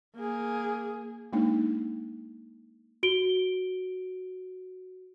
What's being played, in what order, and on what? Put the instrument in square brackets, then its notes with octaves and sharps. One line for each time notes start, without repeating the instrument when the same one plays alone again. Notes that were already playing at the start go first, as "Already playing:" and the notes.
[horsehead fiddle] A#3 G#4
[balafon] G#3 A#3 D4 D#4
[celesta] F#4 D7 G7